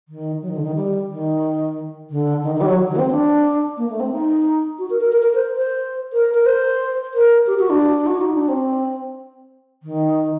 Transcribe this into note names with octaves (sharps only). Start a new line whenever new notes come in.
D#3
F#3
D#3
D3
D#3
G3
D#3
D3
D#3
D#3
G3
F#3
D#3
A#3
C4
D4
A#3
A3
C4
D#4
F#4
A#4
A#4
A#4
A#4
C5
C5
A#4
A#4
C5
A#4
G4
F#4
D4
F#4
D#4
D4
C4
D#3